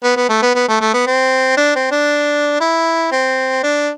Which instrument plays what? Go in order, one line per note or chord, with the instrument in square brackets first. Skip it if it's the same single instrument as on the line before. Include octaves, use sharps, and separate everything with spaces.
[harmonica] B3
B3
A3
B3
B3
A3
A3
B3
C4
D4
C4
D4
E4
C4
D4